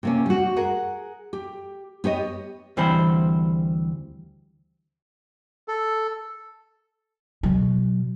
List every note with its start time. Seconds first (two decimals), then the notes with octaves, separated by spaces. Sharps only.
0.03 C3 A#3 C#4
0.26 G3 F#4
0.56 G#4 A#4 F#5
1.33 G4
2.04 B3 G4 C#5 D#5
2.77 D2 E3 G3 C4 C5 B5
5.68 A4
7.43 B2 F#3